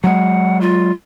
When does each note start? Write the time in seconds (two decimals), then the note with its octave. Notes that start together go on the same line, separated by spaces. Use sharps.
0.04 F#3 G#3 F#5
0.61 F4